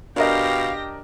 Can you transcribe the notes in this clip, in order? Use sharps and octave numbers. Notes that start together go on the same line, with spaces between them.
B2 D4 G4 A#4 D#5 F5 G5 A#6